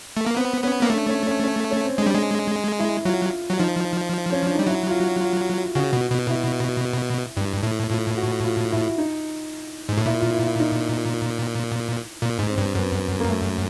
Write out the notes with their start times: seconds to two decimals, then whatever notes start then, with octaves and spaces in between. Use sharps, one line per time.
0.17 A3
0.27 A#3
0.36 B3 C4
0.64 B3 C#4
0.82 A#3
0.90 A3 D4
1.08 C#4
1.26 C#4
1.44 C#4
1.71 C#4
1.84 C4
1.97 G#3 D4
2.06 G3
2.14 G#3
2.79 E4
3.05 F#3 F4
3.49 F#3
3.59 F3 D#4
4.32 C#4
4.44 D4
4.55 G3 D#4
4.67 F#3 E4
4.89 F4
4.94 F#4
5.21 F4
5.75 C#3 F#4
5.93 B2
6.11 B2
6.29 E4
7.37 G2
7.63 A2
7.90 A2 F4
8.17 F#4
8.45 F4
8.71 E4
8.98 D#4
9.89 G#2
9.97 A2
10.06 A#2 E4
10.20 F4
10.33 E4
10.46 E4
10.60 D#4
12.22 A#2
12.39 G#2
12.49 C4
12.58 G2
12.75 F#2 B3
13.20 A#3
13.29 A3